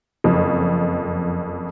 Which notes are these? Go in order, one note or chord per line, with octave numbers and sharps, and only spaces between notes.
F#1 F2